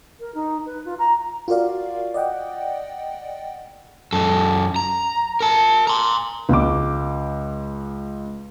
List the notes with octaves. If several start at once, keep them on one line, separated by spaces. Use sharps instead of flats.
A#4
D#4
B4
F4
A#5
F4 F#4 A#4 D5 F5
D5 D#5 F#5 G5
F#2 A4
A#5
A#4 A5
A#5 C6
C#2 D6